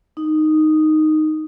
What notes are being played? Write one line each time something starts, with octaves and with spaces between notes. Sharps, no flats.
D#4